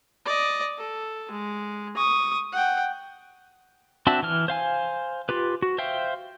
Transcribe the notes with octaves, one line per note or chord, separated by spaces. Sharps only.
D5 D#5
A4
G#3
C#6 D#6
F#5 G5
C4 D4 F#4 E5 A5
E3 F6
C5 F5 G#5
F4 G4 B4
F#4
C5 E5 F5 G5